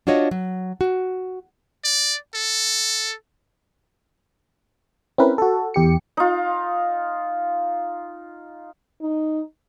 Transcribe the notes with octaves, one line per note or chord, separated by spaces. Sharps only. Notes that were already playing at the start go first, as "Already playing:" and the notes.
D4 F4 F#4 C#5 D#5
F#3
F#4
D5
A4
C4 C#4 E4 A#4 B4
F#4 A4
E2 G4 C#7
D#4 F4
D#4